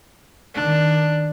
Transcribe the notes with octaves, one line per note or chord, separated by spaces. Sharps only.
D#3 D4